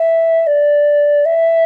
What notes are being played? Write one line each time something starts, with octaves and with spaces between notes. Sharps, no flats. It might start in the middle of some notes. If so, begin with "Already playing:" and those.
Already playing: E5
D5
E5